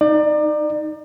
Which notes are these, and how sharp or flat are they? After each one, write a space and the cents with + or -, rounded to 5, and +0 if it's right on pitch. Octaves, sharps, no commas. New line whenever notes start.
D#4 +0 D5 +30